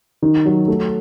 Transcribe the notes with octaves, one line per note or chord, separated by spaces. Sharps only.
D#3
F#3
A3